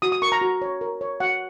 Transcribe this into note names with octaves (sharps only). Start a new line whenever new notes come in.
F#4 D#6
D#6
A#4 C#6
A#5
F#4
C#5
A#4
C#5
F#4 F#5